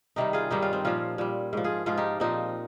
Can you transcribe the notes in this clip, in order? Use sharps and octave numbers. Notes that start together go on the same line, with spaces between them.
C3 D#3 G3 D#4 G4
F4 G#4
G2 D#3 G3 D#4 G4
C#4 F4
C4 D#4
A#2 F3 C#4 F4
A#2 G3
G#2 F3
F4 G#4
G#2 F3 F4 G#4
D#4 G4
A#2 F3 C4 D#4